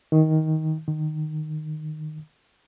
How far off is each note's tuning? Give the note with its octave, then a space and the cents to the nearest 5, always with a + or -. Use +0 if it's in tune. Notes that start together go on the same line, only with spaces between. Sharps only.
D#3 +15
D#3 -15